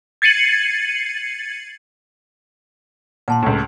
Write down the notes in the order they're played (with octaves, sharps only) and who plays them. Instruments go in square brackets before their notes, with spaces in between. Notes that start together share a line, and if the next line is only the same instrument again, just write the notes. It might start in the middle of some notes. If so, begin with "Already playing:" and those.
[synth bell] G#6 A6 C7 C#7 D#7 F#7
[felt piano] A#2 [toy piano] F#5 A5 C6
[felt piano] C#2 A2